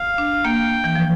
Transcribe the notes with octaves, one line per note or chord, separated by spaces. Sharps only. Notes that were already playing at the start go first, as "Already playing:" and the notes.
Already playing: F5
D4
A#3 G5
E3
F3